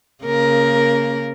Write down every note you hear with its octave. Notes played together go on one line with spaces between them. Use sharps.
C#3 A#3 A#4